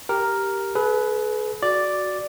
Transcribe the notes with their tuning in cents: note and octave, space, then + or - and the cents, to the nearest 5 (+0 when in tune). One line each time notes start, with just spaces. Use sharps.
G4 +0 A#4 +0
G#4 +45 B4 +0
F#4 +0 D5 +0